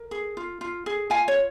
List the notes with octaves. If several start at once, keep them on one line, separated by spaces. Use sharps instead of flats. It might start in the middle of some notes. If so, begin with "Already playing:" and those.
Already playing: A#4
G#4
F4
F4
G#4
F4 F5 G#5
C#5